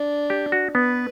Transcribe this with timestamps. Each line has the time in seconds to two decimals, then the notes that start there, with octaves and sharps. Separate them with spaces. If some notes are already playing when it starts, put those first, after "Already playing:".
Already playing: D4
0.30 G4
0.52 F#4
0.75 B3 B4